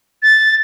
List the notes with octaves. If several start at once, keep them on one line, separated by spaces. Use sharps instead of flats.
A6